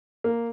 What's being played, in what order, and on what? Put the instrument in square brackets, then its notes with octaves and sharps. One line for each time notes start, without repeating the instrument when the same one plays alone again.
[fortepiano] A#3